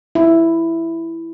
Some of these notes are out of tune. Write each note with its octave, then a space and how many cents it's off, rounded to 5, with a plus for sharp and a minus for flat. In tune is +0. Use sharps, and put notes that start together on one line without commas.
E4 +5